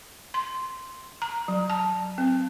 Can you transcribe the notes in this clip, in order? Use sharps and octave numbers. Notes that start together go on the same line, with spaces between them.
C6
A#5
F#3
A5
C4